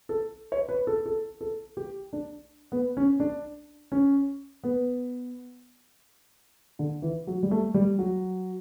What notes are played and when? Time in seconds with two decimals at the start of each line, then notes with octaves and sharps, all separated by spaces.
0.09 A4
0.52 C#5
0.69 B4
0.87 A4
1.06 A4
1.41 A4
1.77 G4
2.13 D4
2.72 B3
2.97 C#4
3.20 D4
3.92 C#4
4.64 B3
6.79 D3
7.02 E3
7.27 F#3
7.43 G3
7.51 A3
7.74 G3
7.99 F#3